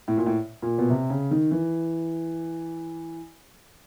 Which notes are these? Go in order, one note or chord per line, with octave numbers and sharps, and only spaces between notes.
A2
A#2
A2
A#2
B2
C3
C#3
D#3
E3